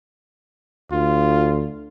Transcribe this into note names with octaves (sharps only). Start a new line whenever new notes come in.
D2 F4